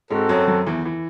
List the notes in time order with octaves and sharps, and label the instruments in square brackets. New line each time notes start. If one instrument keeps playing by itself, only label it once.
[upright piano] G#2 G#3 [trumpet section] C4 F#4 A4
[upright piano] F#2 F#3
F#2 F#3
E2 E3
E3